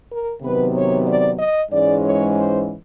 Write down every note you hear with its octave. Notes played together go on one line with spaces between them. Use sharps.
A#4
C3 D#3 F#3 B3 B4
C#5
D5
D#5
G#2 E3 G#3 C#4 D5
C#5
C5